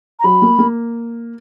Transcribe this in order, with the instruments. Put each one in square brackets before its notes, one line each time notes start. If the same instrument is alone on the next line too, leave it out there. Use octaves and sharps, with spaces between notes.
[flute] A#5
[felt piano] F#3 [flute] B5
[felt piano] A#3
A#3